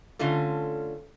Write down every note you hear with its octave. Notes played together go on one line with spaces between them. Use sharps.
D3 A3 C#4 F4 A4